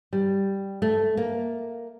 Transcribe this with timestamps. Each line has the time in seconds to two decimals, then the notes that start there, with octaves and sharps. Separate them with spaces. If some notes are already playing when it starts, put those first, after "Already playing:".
0.13 G3
0.82 A3
1.17 A#3